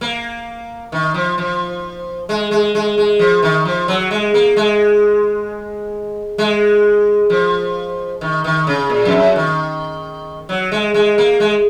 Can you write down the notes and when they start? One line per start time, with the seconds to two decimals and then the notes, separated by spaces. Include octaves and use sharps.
0.01 A#3
0.92 D#3
1.14 F3
1.38 F3
2.29 G#3
2.51 G#3
2.75 G#3
2.98 G#3
3.19 F3
3.42 D#3
3.65 F3
3.88 F#3
4.11 G#3
4.34 A#3
4.56 G#3
6.38 G#3
7.30 F3
8.21 D#3
8.44 D#3
8.67 C#3
8.90 A#2
9.05 F2
9.13 F#2
9.36 D#3
10.49 F#3
10.72 G#3
10.94 G#3
11.18 A#3
11.40 G#3